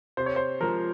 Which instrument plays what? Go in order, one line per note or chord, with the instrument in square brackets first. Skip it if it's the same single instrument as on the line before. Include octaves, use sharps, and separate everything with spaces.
[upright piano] C3 [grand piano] C5
[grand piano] C#5
C5
[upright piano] F3 G#3 [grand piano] A#4